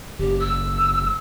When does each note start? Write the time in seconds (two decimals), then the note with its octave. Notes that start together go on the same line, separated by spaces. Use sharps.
0.19 F#1 G4
0.40 E6